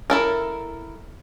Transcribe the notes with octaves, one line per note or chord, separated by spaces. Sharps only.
E4 A4 A#4